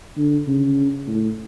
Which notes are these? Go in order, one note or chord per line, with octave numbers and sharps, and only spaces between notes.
D3
C#3
A2